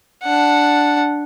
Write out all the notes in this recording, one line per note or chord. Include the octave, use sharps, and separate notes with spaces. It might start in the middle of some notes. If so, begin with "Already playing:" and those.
D4 F#5